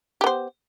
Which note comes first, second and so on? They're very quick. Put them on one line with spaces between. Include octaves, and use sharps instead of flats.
G4 B3 C5